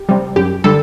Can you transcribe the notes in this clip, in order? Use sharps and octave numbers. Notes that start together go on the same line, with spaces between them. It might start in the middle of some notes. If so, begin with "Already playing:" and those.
Already playing: G4
C3 G3
F#2 G4
D3 G3 A4